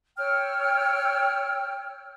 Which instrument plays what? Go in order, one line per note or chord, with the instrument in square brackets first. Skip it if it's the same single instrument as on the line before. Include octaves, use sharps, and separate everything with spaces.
[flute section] C#5 G5 E6 F6